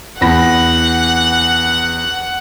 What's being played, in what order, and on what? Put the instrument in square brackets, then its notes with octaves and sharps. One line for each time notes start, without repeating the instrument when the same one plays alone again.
[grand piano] E2 B5 A#6 [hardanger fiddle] F#5